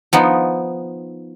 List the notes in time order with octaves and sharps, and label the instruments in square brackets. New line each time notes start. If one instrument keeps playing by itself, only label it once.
[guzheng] F3 B3 D#4